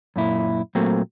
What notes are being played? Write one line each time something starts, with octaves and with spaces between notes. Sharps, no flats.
F#2 A#2 E4
A#2 F#3 A3 A#3 C4